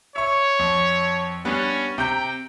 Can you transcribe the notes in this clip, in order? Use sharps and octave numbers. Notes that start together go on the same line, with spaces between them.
C#5 E5 C#6
F2
G3 B3 C#4 D4
C3 G5 A#5 G6